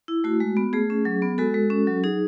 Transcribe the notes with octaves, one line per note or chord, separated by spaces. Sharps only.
E4
A3 F#4
G#3
B3
A3 G#4
C#4
F#3
B3
G#3 F#4 A4
G#3
C#4
F#3
D#4 G#4